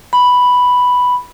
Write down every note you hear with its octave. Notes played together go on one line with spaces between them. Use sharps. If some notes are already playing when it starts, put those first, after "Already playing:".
B5